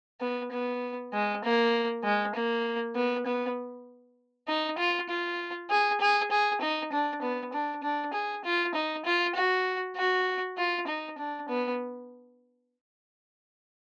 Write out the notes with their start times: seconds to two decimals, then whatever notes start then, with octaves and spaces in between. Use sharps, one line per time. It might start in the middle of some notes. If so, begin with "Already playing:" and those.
0.21 B3
0.52 B3
1.13 G#3
1.44 A#3
2.04 G#3
2.35 A#3
2.96 B3
3.26 B3
4.48 D#4
4.78 F4
5.09 F4
5.70 G#4
6.00 G#4
6.31 G#4
6.61 D#4
6.92 D4
7.22 B3
7.53 D4
7.83 D4
8.13 G#4
8.44 F4
8.74 D#4
9.05 F4
9.35 F#4
9.96 F#4
10.57 F4
10.87 D#4
11.18 D4
11.49 B3